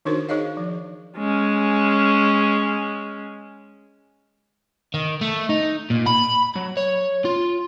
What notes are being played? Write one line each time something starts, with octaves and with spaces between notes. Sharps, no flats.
D#3 D4 D#4 F#4 A#4 C5
D#4 G#4 C#5 D#5 F5
F3
G#3 C#4
D#3
A3
D#4
A#2
B5
F#3
C#5
F4